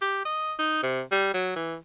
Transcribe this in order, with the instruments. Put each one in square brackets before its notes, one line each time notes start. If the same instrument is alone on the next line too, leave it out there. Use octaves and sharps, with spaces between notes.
[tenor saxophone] G4
D#5
D#4
C3
G3
F#3
E3